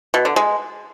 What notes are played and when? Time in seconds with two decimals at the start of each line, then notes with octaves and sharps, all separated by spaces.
0.14 B2
0.25 D3
0.36 G#3